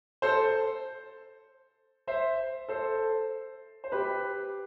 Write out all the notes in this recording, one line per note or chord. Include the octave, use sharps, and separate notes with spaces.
A4 C5
C5 E5
A4 C5
C5
G4 B4